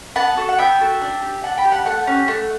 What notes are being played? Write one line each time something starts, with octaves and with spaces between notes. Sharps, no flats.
B3 F#5 A5
F#4 A4
F#5
B3 E5 G5
F#4 A4
D4
G4
D4 F#5 A5
G5 B5
G4
F#5 A5
A3 F#5 A5
C#4 G4
A3